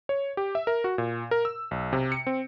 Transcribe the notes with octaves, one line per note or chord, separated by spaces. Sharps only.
C#5
G4
E5
A#4
F#4
A#2
A#4
E6
B1
C3
C#7
C4